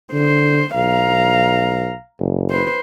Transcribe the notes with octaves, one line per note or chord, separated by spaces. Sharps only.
D3 C5
B1 F5 A#5
F#1
B4 C5